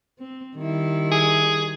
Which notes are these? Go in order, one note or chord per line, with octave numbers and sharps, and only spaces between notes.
C4
D#3 G3 E4
G#4